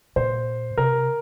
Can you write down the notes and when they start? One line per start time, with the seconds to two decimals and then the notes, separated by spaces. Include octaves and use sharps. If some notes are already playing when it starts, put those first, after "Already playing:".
0.16 A#2 C5
0.77 C3 A#4